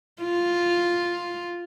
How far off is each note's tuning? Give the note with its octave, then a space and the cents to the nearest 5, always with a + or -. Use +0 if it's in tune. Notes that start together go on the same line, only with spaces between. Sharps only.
F4 +0